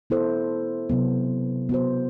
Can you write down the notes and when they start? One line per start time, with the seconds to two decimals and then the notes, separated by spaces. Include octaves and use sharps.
0.10 B3 E4 A4 C5
0.89 C3 F#3 B3
1.69 B3 F#4 C5